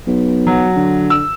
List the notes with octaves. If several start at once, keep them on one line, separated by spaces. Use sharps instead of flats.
B1
F#3
D3
E6